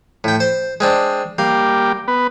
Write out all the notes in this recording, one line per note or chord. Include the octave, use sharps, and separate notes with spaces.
A2 G5
C5
G#3 C4 D4
G3 A#3 G4 F5
B3 B4